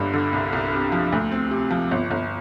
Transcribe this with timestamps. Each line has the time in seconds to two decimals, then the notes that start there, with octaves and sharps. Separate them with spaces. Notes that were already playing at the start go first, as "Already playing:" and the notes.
Already playing: G1 G2 D3 G3
0.14 D3
0.33 C2
0.53 C2
0.73 C3
0.92 F3
1.12 D2
1.31 C4
1.51 C3
1.71 F3
1.91 G1
2.11 G1